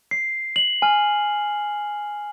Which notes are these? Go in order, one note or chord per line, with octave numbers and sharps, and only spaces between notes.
C7
F#7
G#5 F6